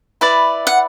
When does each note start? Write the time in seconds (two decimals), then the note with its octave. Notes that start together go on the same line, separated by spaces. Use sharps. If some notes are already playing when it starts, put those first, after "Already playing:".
0.21 E4 B4 D5
0.67 F#5